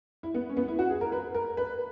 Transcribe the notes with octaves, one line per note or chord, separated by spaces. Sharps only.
E4
B3
C#4
B3
E4
F#4
G#4
A#4
B4
A#4
B4